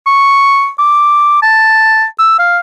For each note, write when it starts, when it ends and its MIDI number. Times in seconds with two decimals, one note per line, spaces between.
0.06 0.69 85
0.79 1.42 86
1.42 2.04 81
2.19 2.35 88
2.39 2.59 77